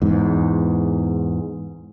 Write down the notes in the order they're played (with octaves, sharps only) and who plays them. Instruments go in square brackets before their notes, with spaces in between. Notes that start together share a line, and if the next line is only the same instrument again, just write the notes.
[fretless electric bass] E2 G#2